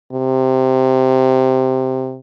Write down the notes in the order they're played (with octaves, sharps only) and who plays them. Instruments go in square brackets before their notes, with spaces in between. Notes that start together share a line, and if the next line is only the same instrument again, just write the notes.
[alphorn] C3